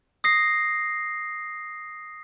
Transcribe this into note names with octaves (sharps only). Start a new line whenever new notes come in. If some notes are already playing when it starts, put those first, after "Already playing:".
D#6 A#6 C7